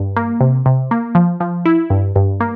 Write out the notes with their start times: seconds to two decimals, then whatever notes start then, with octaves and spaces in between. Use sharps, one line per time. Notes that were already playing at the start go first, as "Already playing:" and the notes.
Already playing: G2
0.16 A#3
0.40 C3
0.66 C3
0.91 A#3
1.15 F3
1.40 F3
1.65 E4
1.90 G2
2.16 G2
2.40 A#3